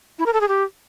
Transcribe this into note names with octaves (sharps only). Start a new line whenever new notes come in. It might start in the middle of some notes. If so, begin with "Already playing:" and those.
E4
A#4
A4
G#4
G4